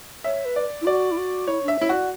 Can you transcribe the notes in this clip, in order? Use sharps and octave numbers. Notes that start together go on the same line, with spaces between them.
C#5 E5
B4
D5
E4
F#4 D5
E4
F#4
E4 C#5
D4 E5
E4 C#5
F#4 D5